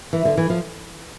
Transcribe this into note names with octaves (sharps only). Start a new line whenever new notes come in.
E3
D3
E3
F3